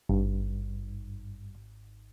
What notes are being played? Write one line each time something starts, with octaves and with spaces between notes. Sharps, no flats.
G#1 G2